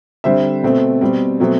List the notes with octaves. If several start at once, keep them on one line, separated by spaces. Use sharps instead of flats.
D3 G3 C4 C5 E5
B2 A3 C4
B2 G3 C4
B2 F#3 A3 C4